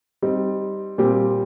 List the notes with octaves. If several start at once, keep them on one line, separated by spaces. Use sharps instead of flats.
G3 C4 D#4
A#2 G3 C4 G4